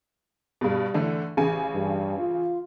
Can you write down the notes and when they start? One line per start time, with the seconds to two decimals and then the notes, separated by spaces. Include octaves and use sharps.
0.61 G2 B2
0.94 D3 E3 A3
1.37 A1 C#3 G#5
1.74 G2
2.18 F4